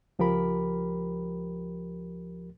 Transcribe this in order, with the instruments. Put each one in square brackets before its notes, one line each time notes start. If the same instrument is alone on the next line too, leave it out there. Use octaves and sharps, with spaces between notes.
[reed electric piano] C#2 F3 G4 A#4 B5